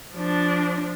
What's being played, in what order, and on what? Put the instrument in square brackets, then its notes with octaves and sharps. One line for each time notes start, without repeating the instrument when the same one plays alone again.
[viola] F3 D4